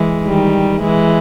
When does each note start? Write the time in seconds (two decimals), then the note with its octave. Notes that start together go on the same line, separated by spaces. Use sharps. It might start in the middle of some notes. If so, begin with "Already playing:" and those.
Already playing: E3 G#3
0.25 D#3 G3
0.83 E3 G#3